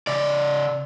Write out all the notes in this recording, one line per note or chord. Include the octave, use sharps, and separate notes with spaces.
C#3 D5